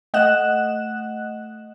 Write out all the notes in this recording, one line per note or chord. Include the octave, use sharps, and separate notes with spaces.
A3 D#5 F#5 F#6 E7